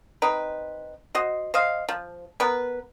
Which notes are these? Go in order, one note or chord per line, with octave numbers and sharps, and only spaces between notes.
C4 D#4 B4
F#4 C5 D#5
C5 D#5 F5
F3
B3 A#4 B4